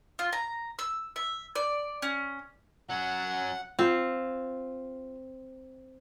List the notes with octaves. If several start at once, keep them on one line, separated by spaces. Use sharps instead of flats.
F4
A#5
E6
E5
D5
C#4
F#3 C#4 F#5
C4 F4